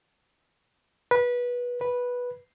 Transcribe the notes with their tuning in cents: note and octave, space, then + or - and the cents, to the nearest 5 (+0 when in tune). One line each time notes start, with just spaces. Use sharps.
B4 -20
B4 -10